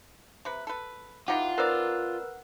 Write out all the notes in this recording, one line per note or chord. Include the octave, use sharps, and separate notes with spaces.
C3 B4
A4 B4
E3 D#4 F4 G4 F#5
C4 D#4 A#4 B4 D5 E6